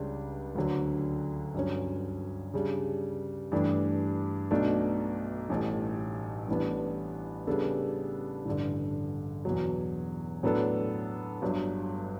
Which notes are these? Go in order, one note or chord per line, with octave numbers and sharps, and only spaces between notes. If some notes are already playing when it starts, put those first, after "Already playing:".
Already playing: C#2 C#3 G3 D4 G4
D2 D3 F#3
G2 F#3 C#4
C#3 G3 D4
G2 E3 A3 D4 G4
B1 B2 A3 D4
A1 A2 G3
A1 A2 G3 B3 D4
C#3 G3 B3 D4 A4
A1 G2 D3
E2 B2 F#3
A2 F#3 B3 D4 A4
G1 G2 F#3